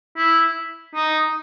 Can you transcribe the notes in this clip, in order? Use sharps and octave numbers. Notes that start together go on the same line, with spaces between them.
E4
D#4